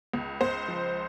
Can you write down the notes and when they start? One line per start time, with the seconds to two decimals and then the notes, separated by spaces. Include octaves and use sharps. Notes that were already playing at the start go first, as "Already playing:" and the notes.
0.14 C#2
0.41 C#2 C5
0.68 F3